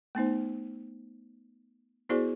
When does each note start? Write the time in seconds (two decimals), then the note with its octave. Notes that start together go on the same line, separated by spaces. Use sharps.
0.15 A3 B3 D#4 C5
2.09 B3 E4 F#4 G#4 C5 D5